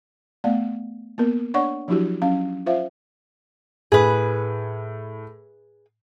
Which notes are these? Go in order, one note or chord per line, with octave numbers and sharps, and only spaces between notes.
A3 B3 D5 F5
A#3 B3 A#4
D4 C#5 D5 F#5 C#6
F3 F#3 D4 E4 F#4 G4
F#3 C#4 F5
F4 C5 E5 F5
A2 G#4 B4